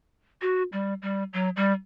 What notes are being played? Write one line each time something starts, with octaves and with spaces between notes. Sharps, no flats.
F#4
G3
G3
F#3
G3